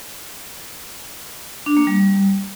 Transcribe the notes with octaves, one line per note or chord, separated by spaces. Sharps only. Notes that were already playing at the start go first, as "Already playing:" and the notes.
D4
A#3
G3